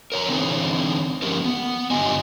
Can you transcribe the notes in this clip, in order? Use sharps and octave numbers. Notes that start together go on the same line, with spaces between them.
A#4 C#5 A#5
D3 E3 C4 D#4 G#4 C#5
D3 F3 A#3 C#4 G4 A#4
B3
G2 D3 F4 G4 D#5 G#5